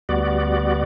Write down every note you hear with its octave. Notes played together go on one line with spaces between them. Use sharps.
D2 G3 B3 F#4 D5